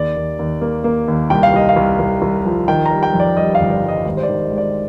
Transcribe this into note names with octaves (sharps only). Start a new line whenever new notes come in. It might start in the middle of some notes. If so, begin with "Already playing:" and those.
Already playing: D#2 D5
D#2
D#2
A#3
A#3
D#2
C2 G5
F5
C2 D#5
F5
C2
C2
C2
F3
D#3 G5
G3 A#5
G5
F2
D5
G3 D#5
F5
G1
D5
G3
D#5
G#1
C5
D5
D#3
G#3
D5